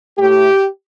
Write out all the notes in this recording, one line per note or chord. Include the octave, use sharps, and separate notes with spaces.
A2 A3 G4